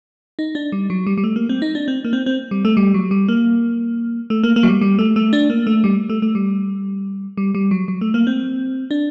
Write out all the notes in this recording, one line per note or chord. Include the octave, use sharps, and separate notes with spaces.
D#4
D4
G3
F#3
G3
G3
A3
A#3
C4
D#4
D4
C4
A#3
C4
C4
G3
A3
G3
F#3
G3
A#3
A3
A#3
A#3
F#3
G3
G3
A3
A3
D4
A#3
A3
G3
A3
A3
G3
G3
G3
F#3
F#3
A3
A#3
C4
D4